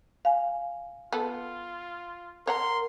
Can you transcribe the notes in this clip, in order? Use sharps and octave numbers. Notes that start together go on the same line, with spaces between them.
F5 G#5
B3 F4 A4
A#4 C#5 F#5 A#5 C6